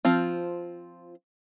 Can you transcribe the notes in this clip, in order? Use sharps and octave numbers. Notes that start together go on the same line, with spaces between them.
F3 C4 F4